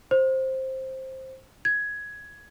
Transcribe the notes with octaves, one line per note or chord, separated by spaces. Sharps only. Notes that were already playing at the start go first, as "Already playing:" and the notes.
C5
G#6